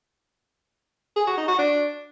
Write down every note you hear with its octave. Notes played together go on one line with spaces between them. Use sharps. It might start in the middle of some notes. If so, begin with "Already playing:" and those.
G#4
F#4
D#4
F#4
D4